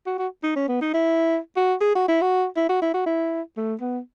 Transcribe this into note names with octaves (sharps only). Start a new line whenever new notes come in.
F#4
F#4
D#4
C#4
B3
D#4
E4
F#4
G#4
F#4
E4
F#4
E4
F#4
E4
F#4
E4
A3
B3